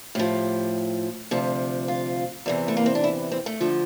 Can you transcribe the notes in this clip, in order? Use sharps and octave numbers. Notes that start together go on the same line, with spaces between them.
A2 F3 G4
D2 C3 F3
F4
E2 C3 E3
A3
A#3
C4
D4
E4
C4
A3
D3 F3